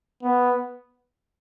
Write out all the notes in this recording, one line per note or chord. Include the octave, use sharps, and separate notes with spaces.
B3